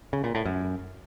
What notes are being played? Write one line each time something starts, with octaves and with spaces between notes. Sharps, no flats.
C#3
A#2
A2
F#2